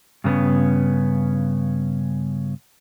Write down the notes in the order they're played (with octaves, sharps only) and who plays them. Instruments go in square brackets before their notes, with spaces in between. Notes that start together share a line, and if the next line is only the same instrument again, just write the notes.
[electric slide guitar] G2 C#3 A#3 B3 C#4